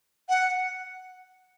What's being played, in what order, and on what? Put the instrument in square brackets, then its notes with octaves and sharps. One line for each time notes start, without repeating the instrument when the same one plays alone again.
[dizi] F#5